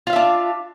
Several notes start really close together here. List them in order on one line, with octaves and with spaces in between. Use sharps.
F4 F5 E5 D4